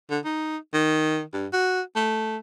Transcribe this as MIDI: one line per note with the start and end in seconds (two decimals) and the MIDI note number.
0.10 0.19 50
0.25 0.57 63
0.73 1.22 51
1.33 1.47 43
1.53 1.81 66
1.96 2.37 57